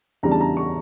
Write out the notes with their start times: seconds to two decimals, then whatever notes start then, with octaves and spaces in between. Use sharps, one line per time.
0.23 E2 C#3 E3 G3 D4 A#5
0.31 A5
0.41 A#5
0.57 C#6